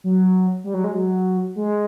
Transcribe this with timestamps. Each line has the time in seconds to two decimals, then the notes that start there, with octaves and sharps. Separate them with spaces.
0.04 F#3
0.64 G3
0.74 F#3
0.84 G#3
0.95 F#3
1.56 G#3